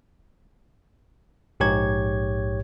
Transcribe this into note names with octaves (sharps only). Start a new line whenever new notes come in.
A#1 G#2 G4 C#5 G#6